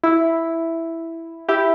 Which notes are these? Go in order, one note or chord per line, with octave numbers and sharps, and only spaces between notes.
E4
E4 G4